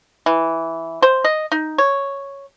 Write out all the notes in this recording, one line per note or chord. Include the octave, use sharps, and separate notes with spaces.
E3
C5
D#5
D#4
C#5